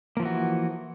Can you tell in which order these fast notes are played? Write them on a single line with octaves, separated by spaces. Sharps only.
A#3 F3 E3 F#4